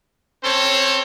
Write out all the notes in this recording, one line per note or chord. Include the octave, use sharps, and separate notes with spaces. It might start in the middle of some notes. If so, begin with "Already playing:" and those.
C4 C#4 A4 C5 C#5